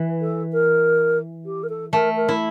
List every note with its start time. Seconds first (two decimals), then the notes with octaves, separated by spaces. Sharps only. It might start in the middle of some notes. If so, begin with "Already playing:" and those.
Already playing: E3
0.21 A4
0.52 A#4
1.45 G4
1.63 A#4
1.69 A4
1.92 A3 A#4
2.16 A#4
2.29 E4